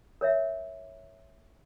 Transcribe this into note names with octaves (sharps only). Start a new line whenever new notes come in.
A#4 C#5 E5